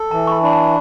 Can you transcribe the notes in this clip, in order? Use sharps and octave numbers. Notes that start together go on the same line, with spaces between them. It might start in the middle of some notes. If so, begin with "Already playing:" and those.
Already playing: A4
E3 A5
C#6
B5
D4 B5
A5